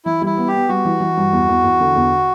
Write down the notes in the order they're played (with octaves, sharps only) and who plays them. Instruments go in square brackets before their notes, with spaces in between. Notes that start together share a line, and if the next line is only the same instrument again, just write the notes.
[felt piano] E3 [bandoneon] E4
[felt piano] G3 [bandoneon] E4
[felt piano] B3
[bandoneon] G4
[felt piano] B3
[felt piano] G3 [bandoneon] F#4
[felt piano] E3
E3
G2
E2
E2
E2
D3
E2